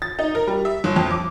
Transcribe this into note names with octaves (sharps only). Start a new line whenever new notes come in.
A6
D#4
A#4
G3
E5
G1
F2
D6